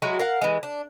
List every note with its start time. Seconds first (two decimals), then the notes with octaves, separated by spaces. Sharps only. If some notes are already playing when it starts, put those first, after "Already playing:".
0.02 F#3 G#3 E4 F#4
0.19 A#4 F5 F#5
0.41 E3 G#3
0.63 D4